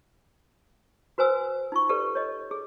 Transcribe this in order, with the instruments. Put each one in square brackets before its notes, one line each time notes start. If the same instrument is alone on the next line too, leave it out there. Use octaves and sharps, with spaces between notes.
[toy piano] F#4 B4 C5 G#5 E6
D#4 F4 C#6
G4 A4 B4 D5
C#5 D#5
G#4